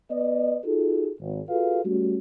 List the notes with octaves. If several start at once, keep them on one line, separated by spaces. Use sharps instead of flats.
B3 B4 D5 D#5
D#4 F4 F#4 G#4 A4
G#1
F4 F#4 G#4 A4 B4 F5
G3 A3 C#4 F#4